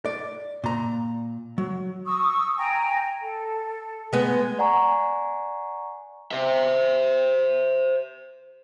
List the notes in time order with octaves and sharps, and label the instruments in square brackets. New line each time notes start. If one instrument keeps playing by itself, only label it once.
[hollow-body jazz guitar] D5
A#2 A#5
F#3
[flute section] C#6 D#6 E6
G5 G#5 A#5
A4
[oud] G#3 B3
[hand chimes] D5 F#5 G#5 A#5 C#6
[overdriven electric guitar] C5 E5